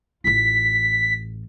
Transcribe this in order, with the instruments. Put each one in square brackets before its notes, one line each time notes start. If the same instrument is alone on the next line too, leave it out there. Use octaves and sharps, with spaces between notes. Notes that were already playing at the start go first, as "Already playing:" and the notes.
[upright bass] A1 F4 [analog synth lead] B6